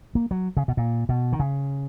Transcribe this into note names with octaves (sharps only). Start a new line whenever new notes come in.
A#3
F#3
C#3
B2
A#2
B2
D#3
C#3